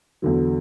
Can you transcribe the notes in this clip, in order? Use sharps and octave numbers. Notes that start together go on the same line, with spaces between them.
E2 D3 F#3